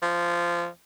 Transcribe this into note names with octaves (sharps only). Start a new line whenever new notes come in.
F3